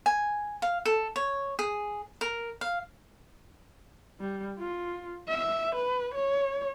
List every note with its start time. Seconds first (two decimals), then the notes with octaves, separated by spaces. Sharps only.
0.06 G#5
0.62 F5
0.85 A4
1.16 C#5
1.59 G#4
2.21 A#4
2.61 F5
4.20 G3
4.59 F4
5.29 E5
5.75 B4
6.15 C#5